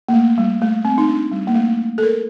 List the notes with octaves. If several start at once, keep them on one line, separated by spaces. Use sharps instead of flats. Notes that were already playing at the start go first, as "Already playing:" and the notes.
A#3
A3
G3
A3
C4
D#4
D4
G3
A#3
A3
A4
A#4